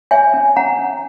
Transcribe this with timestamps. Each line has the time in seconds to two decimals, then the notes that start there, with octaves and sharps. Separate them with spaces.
0.11 C#5 E5 G#5
0.34 C#4
0.56 C#4 F#5 A#5
0.79 C#4